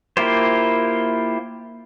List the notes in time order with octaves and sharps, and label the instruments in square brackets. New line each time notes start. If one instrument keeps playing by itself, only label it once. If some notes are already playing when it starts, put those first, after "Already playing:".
[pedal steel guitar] A#3 E4 F4 G4 C5